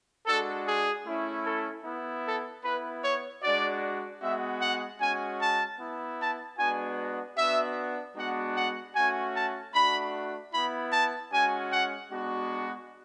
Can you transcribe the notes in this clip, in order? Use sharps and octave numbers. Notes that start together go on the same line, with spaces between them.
G#3 D4 F#4 A4
G#4
A3 C#4 E4
A4
B3 E4
A4
B3 E4 B4
C#5
G#3 D4 F#4 D5
G#3 B3 F#4 E5
F#5
G#3 C#4 F#4 G#5
A5
B3 E4
A5
G#3 B3 D4 F#4 G#5
B3 D4 F#4 E5
G#3 B3 D4 F#4 F#5
F#5
A3 C#4 F#4 G#5
A5
A3 D4 F#4 B5
B3 E4 B5
A5
G#3 C#4 F#4 G#5
F#5
G#3 B3 D4 F#4